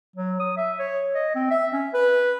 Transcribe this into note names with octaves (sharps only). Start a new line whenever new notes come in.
F#3
D#6
E5
C#5
D#5
C4
E5
C#4
B4